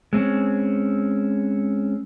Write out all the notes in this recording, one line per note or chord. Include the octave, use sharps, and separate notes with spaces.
G#3 C4 C#4